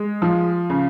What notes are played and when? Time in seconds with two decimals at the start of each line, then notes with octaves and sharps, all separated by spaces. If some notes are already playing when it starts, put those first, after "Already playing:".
Already playing: G#3
0.22 F3
0.70 C#3